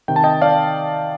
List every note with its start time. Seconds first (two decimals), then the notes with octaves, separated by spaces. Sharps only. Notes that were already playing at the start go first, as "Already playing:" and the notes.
0.08 C3 D#3 G5
0.16 A5
0.24 D#5 G5
0.42 D5 F5